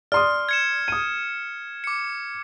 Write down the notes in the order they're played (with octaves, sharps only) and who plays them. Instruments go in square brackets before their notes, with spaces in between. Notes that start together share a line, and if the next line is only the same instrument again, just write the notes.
[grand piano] D5 C6 D#6 [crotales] F6
[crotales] G#6 C#7 E7
[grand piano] D#6 D#7
[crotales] D6 C#7